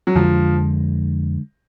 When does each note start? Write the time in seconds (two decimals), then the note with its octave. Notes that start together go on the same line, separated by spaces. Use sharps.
0.07 F#3
0.15 F2 D3 F3 G#3